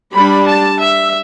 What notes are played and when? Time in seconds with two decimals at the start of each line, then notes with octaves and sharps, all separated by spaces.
0.12 G3 D4 B5
0.48 A5
0.82 E5